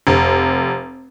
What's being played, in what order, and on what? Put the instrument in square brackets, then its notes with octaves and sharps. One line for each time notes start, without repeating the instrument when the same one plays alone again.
[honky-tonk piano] F1